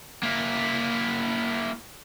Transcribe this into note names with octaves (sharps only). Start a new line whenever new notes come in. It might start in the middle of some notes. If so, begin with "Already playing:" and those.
A#3 E4